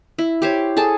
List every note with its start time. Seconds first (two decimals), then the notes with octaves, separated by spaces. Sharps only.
0.19 E4
0.42 G4 C5 C#5
0.77 G#4 A4 A5